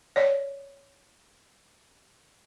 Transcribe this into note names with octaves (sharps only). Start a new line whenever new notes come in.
C#5 D5